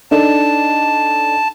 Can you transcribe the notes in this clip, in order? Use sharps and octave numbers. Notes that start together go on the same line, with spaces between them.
D4 D#4 A4 A5